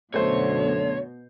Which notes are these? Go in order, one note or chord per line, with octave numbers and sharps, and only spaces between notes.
F#2 B2 D3 A3 C5 C#5